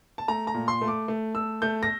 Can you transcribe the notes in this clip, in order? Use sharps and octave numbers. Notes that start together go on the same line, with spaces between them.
A5
A3 A#5
A#5
A#2
C6
A3
D6
A3
A3 E6
A3 G6
A#6